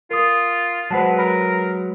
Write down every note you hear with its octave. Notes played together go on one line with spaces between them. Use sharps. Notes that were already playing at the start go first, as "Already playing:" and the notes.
F4 A#4 D#6
F#3 G#3 B4 C5 F#5 A5
A#4 B5